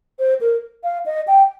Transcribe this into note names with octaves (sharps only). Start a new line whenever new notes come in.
C5
A#4
F5
D#5
G5